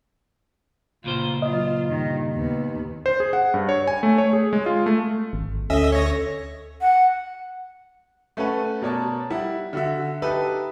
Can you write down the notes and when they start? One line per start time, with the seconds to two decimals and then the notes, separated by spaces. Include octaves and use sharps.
1.04 C#2 A#2 F4 C5
1.42 F#3 F4 D#5
1.86 G2 D#3
2.34 D#2 B3
3.06 C5
3.20 G#4
3.33 F#5
3.54 G2
3.69 C#5
3.87 G#5
4.03 A3
4.18 C#5
4.33 G#4
4.53 G#3
4.66 F4
4.86 A3
5.33 G#1
5.70 D2 C#4 A4 D#5 E5
5.92 C#5 A#6
6.81 F#5
8.37 A3 C#4 A4 B4 F#5
8.82 B2 A#4 C#5 D5 A5
9.30 G3 E4 F#5
9.73 D3 F#4 E5
10.22 D#4 G4 A4 B4 E5